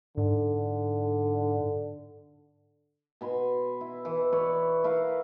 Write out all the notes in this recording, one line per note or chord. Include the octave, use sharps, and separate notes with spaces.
G#2 D3
B2 G#5 B5 C6
E4
E3
B4 C#5 D5
E4 A#4 B4 F5